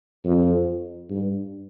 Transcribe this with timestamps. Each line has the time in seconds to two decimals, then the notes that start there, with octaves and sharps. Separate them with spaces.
0.25 F2
1.11 G2